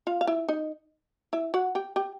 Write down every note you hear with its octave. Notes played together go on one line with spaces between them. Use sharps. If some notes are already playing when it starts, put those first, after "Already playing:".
F4 F5
F5
E4 E5
D#4 D#5
E4 E5
F#4 F#5
G4 G5
G4 G5